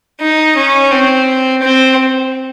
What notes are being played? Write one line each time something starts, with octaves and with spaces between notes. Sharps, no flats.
D#4
C#4
C4
C4